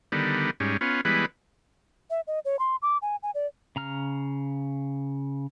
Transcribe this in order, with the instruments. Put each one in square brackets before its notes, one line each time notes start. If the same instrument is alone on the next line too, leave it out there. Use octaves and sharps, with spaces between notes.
[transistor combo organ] D3 D#3 G3 B3
G#2 G3 C#4
B3 C#4 F4
E3 G3 G#3 B3 B4
[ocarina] E5
D#5
C#5
C6
D6
G#5
G#5
D5
[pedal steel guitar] C#3 A#5 F6